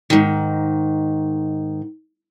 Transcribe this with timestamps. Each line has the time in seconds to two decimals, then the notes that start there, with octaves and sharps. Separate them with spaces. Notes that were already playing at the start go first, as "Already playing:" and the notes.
0.10 G#2 D#3